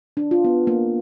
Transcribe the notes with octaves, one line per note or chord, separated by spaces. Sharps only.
D4
F4
B3
A#3